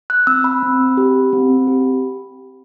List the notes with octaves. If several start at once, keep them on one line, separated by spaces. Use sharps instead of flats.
F#6
C4 E6
B5
C4
G4
C4
G4